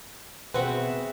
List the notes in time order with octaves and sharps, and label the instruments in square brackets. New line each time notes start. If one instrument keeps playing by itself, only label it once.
[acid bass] B2 [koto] C4 F#4 [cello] G#4 E5 [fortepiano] B4